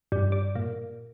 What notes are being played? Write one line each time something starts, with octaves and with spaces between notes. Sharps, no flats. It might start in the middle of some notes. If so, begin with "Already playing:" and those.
G2
D5
A#2